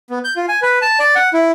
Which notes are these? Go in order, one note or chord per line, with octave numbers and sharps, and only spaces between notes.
B3
G6
F4
G#5
B4
A5
D5
F#5
E4